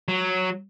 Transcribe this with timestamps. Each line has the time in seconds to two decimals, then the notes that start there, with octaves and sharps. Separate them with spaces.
0.08 F#3